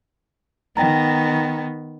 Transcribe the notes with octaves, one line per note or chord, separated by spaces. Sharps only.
D#3 B3 G5 A#5